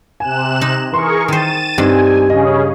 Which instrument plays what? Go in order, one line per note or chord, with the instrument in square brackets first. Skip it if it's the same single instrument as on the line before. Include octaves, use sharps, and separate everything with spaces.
[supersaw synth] C3 F#6 E7 [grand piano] G#5
[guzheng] D#4
[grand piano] E3 C6 [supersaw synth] G#4 A#4 C#6
[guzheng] D#3 C5 [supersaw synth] A6 D#7 E7
[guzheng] G2 [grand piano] C4 D4 D#4 [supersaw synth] G#5
[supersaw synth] C#3 C#4 G#4 [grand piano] D#5